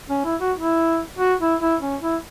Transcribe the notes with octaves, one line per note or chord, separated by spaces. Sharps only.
C#4
E4
F#4
E4
F#4
E4
E4
C#4
E4